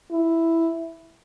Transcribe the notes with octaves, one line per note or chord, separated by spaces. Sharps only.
E4